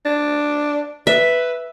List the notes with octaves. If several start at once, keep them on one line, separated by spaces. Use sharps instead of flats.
D4
B4 E5